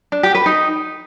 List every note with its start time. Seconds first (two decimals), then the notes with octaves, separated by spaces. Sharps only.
0.12 D4
0.23 G4
0.35 B4
0.46 D#4